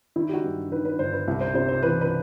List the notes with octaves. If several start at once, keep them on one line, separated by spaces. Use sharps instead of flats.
D#3 E4
G4
F#4
G2
D#3 B4
B4
G1 C5
B4
C2
C5
C3 C5
C5
E3 B4
B4